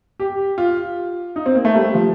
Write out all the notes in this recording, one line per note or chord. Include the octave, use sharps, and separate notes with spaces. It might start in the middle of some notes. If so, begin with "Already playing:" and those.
G4
F4
D#4
C4
A#3
A3
G3
F3